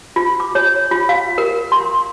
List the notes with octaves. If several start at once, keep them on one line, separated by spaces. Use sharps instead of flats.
F4
D6
C#5
F4
F5
A#4
C6